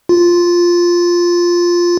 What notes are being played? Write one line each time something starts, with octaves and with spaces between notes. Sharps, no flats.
F4